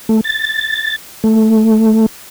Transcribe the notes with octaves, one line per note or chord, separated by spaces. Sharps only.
A3
A6
A3